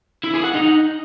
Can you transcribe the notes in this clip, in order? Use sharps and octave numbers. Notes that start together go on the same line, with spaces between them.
E4
G#4
F#5
D#4